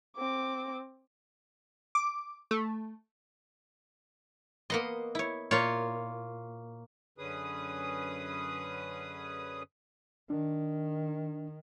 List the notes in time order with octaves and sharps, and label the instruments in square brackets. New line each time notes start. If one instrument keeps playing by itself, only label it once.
[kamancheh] C4 D6
[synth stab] D6
A3
[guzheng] A#3 B3 C6 [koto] D#5
[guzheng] E4 C#5
[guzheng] A#2 [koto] A#3 F4 C#5
[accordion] F#2 D3 C#4 G#4 B4 D#6
[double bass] D#3 [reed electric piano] D4